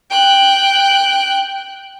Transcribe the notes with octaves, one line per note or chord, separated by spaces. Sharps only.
G5 F#6